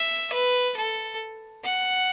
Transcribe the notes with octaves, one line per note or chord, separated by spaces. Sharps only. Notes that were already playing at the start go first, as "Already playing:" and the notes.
Already playing: E5
B4
A4
F#5